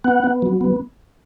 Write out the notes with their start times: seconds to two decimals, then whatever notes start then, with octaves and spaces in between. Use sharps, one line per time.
0.04 B3 F#5
0.24 B3
0.42 F#3
0.61 B3